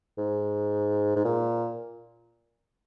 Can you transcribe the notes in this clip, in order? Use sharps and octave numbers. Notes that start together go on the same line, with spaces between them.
G#2
G#2
A#2